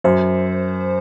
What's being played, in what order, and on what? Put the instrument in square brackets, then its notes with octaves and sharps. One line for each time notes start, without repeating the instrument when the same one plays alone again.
[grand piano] F#2 [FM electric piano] C5